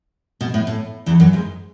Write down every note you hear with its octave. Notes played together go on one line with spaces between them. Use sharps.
B2
A2
A2
E2 E3
F#2 F#3
G#2 G#3